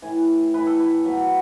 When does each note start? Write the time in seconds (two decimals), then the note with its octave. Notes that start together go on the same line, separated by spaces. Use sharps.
0.02 A2 E3 G#5
0.54 A2 E3 B4
0.67 A4
0.79 B4
1.05 B2 F#3